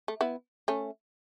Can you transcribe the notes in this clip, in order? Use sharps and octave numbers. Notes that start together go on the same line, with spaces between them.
A3
B3 E4
A3 C#4